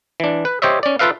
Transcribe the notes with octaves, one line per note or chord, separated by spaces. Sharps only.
E3 D4
B4
G4 C5 C#5 D#5 E5
C#4 D5
F4 A4 B4 E5 F5